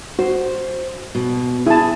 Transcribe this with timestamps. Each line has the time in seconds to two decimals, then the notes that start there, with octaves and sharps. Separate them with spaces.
0.19 F#4 C5
1.15 B2
1.66 E4 G#4 A5